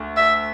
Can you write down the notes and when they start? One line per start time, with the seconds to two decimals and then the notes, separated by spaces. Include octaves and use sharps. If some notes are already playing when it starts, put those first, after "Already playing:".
Already playing: D2
0.16 E5